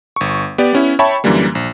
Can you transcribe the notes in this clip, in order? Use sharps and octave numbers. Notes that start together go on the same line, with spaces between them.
G1 C#6
B3 G4 D5
B3 C#4 E4
C#5 E5 G5 A5 B5 C#6
F#2 D3 E3 G3 A#3
A#1